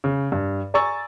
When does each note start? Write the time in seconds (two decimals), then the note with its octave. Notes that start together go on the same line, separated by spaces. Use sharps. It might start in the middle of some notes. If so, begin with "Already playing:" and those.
0.04 C#3
0.32 G2
0.74 D5 G#5 A#5 C#6 E6 A6